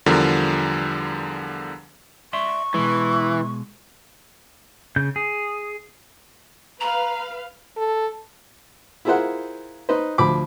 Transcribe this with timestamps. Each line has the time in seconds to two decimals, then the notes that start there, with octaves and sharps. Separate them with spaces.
0.06 E2 D3 F3 G3 A#4
2.33 D5 E5 C6 C#6
2.74 B2 E3 G#3
4.96 C#3 G6
5.16 G#4
6.80 B4 F5 A#5
7.77 A4
9.05 E4 F4 G#4 A#4 C5 F#5
9.89 D#4 B4 C5
10.18 D2 F3 B5 D6